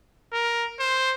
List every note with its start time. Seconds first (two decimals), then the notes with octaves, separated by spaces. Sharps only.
0.32 A#4
0.79 C5